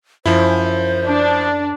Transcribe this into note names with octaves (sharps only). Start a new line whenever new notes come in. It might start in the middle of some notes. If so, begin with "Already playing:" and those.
F#2 F3 E4 C5
D4